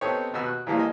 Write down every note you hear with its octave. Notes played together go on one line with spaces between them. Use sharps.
B3 C4 D#4 G4 A4 C#5
D#2 B2 F#4 B4 E6
F#6
A#2 E3 F3 G3 G#3 A#3
D#5 G#5